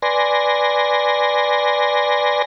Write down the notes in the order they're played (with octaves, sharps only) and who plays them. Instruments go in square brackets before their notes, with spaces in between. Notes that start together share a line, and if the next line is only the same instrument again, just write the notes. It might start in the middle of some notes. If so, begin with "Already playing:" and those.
[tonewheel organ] B4 D5 G#5 C6 A#6